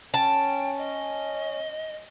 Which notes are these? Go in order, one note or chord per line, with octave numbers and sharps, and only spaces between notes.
C#4 G5 A5
D#5